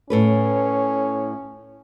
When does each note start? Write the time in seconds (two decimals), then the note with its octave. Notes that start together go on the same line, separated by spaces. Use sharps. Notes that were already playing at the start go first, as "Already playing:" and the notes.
0.10 A2 C#4 A4 B4